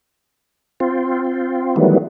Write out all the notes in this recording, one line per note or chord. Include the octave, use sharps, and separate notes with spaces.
C4 F4
D#3 E3 F#3 G3 A3 B3